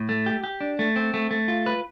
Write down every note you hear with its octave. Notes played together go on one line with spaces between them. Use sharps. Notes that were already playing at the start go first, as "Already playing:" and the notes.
Already playing: A2
A3
G4
G4
D4
A3
C4
A3
A3
F4
B4